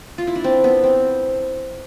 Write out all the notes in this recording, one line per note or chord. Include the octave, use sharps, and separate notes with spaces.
F4
E4
D4
C4
B3
C4